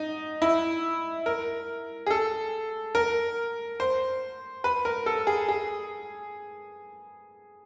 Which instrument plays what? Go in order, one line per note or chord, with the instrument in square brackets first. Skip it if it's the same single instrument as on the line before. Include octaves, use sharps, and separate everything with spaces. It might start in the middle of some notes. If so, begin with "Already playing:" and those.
Already playing: [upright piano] D#4
E4
A#4
G#4
A4
A#4
C5
B4
A#4
A4
G#4
G#4